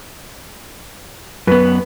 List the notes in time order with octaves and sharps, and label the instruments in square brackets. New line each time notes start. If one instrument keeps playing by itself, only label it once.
[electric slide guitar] F#2 B3 [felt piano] B4